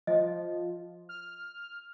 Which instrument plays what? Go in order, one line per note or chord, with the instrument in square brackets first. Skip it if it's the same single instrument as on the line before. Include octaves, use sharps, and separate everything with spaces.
[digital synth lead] F3 [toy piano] D#5
[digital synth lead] F6